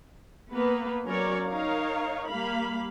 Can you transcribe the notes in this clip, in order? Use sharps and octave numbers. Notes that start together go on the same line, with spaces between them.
A#3 B3 B4
F#3 C#4 A#4 C#5 D5
D#4 A#4 C#5 F5
G3 A#3 F5 B5